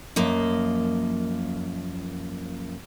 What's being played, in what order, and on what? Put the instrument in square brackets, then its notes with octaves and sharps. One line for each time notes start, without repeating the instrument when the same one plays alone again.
[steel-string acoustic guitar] F#2 F3 A#3 D#5